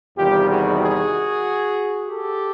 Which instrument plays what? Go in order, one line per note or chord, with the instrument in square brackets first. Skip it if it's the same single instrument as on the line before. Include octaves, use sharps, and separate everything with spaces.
[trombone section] E2 C3 D#3 G3 F4 G4
F#4 G#4
F#4 G#4
G4 A4